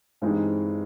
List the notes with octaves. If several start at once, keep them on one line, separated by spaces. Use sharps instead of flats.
G2 E3 G#3 C4 D#4